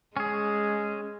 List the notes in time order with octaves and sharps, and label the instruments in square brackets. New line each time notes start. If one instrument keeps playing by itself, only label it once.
[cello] G#3 [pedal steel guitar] C#4 G#4